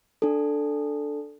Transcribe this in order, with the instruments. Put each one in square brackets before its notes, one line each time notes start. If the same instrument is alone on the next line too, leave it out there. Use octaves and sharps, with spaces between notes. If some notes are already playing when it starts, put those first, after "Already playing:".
[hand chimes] D4 A4